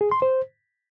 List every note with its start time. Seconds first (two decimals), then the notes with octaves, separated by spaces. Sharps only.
0.01 G#4
0.11 C6
0.22 C5